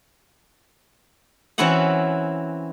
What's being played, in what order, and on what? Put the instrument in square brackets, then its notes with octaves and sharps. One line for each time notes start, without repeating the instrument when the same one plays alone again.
[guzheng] E3 C4 C#4 E4 F#4 F#5